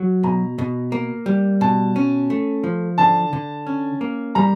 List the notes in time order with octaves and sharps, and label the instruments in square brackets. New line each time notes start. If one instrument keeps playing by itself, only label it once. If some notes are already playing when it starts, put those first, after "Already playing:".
Already playing: [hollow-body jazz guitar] F#3
[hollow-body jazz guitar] B2 [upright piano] A#5
[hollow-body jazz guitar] B2
A#3
G3
[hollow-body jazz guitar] B2 [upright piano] A5
[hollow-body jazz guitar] C#4
A3
F3
[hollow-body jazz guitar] D3 [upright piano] A5
[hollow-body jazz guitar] D3
C#4
A#3
[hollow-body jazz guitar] G3 [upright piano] A#5